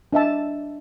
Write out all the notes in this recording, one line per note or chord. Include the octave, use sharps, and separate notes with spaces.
D4 D#5 E5 A5